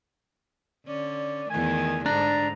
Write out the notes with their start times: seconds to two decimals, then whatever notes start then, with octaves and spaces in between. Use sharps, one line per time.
0.87 D3 C#4 D5
1.50 E2 D#3 A3 G#5
2.06 G#2 D3 D4 A#5